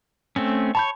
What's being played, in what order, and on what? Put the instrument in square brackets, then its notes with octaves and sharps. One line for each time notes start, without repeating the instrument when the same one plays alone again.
[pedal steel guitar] A3 C4 C#4
[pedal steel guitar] C#5 [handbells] A5 B5 G6